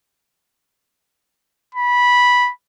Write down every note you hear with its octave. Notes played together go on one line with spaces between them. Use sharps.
B5